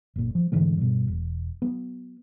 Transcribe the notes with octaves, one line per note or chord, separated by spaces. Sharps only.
F#1 A#2
F3
G#2 D3 E3 A3
G2 B2
E1
F#3 B3